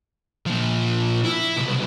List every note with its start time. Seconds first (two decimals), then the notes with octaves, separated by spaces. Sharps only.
0.46 A#2 F3
1.24 E4
1.57 C2 B2